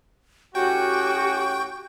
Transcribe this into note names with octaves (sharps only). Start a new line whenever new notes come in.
A2 C#4 F#4 G4 G5 C#6